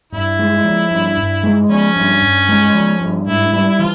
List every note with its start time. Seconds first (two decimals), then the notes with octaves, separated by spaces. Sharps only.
0.12 G2 E4
0.39 G#3
0.64 F3
0.91 G2
1.17 G2
1.43 G#3
1.69 F3 C#4
1.96 G2
2.22 G2
2.49 G#3
2.74 F3
3.01 G2
3.27 G#2 E4
3.53 G3 E4
3.69 E4
3.79 E3 F4